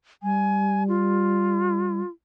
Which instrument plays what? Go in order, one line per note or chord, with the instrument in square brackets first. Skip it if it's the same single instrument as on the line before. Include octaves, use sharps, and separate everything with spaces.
[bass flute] G3 [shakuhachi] G#5
[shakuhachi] F4